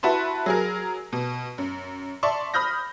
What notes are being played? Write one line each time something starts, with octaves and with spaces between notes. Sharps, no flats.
E4 F#4 B4 A5 C6
F#3 G#4 A#4
B2
F#2
D5 E5 A5 C6 C#6
B5 D#6 F6 G6 A#6